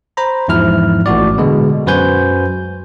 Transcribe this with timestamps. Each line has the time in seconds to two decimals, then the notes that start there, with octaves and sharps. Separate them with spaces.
0.17 C5 A#5 B5
0.48 E2 G#2 F3 E4 F6
1.06 A1 A2 F#4 D5
1.38 B2 D3 G#3
1.86 F#2 F#4 B4 C5 G#5 G6